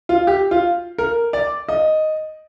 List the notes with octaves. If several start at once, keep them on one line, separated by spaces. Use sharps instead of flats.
F4
G4
F4
A#4
D5
D#5